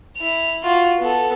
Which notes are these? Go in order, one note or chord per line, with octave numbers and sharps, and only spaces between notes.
E4 F7
F4 F#4
B3 A4